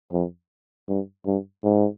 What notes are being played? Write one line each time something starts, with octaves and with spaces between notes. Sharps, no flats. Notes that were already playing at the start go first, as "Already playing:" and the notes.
F2
G2
G2
G#2